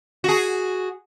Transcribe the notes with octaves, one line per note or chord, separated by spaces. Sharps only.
F#4 G#4